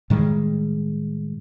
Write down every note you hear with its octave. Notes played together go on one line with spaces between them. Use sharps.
A2 D#3 G3 G#3